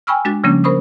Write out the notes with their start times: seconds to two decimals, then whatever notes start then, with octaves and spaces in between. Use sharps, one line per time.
0.07 G5 G#5 B5 C#6 E6 F6
0.25 G#3 D4 F#4 A6
0.44 C#3 F3 G3 A#3 C#4 D4
0.64 A#4 C5 B5 C#6 D#6